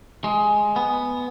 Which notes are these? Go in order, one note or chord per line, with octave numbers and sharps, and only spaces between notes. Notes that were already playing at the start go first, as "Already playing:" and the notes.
G#3
B3